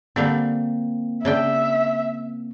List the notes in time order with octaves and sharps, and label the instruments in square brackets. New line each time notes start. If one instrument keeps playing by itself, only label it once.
[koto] D3 G3 F5 [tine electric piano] A#3 C4
[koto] C#3 D4 G5 [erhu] E5